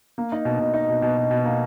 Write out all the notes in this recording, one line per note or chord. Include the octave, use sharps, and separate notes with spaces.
A#3
D#4
B2
B2
D#4
B2
B2
B2
B2
A#3